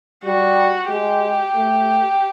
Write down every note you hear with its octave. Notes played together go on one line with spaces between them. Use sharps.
G3 F#4
G#3 G4
A3